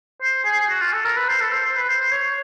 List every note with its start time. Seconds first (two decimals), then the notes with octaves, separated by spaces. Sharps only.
0.22 C5
0.45 G#4
0.69 F#4
0.81 F4
0.93 A4
1.05 A#4
1.17 B4
1.29 C5
1.41 A4
1.52 C5
1.64 C5
1.77 B4
1.89 C5
1.99 C5
2.12 C#5